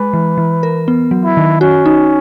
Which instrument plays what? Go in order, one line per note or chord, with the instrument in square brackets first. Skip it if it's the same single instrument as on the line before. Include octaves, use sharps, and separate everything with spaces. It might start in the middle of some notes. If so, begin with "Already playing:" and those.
Already playing: [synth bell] G#3 [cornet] B4
[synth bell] E3
E3
A#4
B3
F#3
[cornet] E4
[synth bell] D#3
[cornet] C#4 [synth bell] F#4
[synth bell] D#4